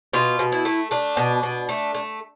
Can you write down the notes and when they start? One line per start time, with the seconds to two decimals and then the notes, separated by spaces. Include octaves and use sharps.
0.13 B2 F4
0.39 B2
0.52 E4
0.65 A3
0.91 A3 D4
1.17 B2
1.43 B2
1.69 A3
1.95 A3